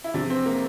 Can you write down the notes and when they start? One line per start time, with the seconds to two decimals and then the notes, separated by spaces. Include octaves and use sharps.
0.04 E4
0.14 E2 C3 F3 D4
0.30 C4
0.46 A#3